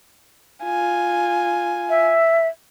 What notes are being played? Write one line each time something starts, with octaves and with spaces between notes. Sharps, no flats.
F4 G#5
E5